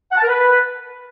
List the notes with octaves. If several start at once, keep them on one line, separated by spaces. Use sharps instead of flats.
F#5
A5
A#4
B4